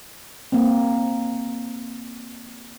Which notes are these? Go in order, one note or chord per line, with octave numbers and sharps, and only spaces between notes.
A#3 C4